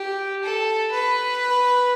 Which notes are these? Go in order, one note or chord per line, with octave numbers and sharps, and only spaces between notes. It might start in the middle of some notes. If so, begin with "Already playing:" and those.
Already playing: G4
A4
B4